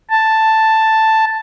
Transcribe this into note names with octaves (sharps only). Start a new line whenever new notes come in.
A5